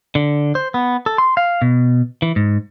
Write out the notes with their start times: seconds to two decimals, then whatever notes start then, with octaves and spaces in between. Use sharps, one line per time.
0.15 D3
0.55 C5
0.74 B3
1.06 A4
1.18 C6
1.37 F5
1.62 B2
2.22 E3
2.36 G#2